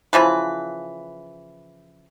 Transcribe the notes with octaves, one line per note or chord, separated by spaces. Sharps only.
C#3 E3 F3 B4